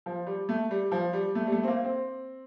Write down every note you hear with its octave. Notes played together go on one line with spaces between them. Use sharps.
F3
G3
A3
G3
F3
G3
A3
G3
A3
C4
A#3
C4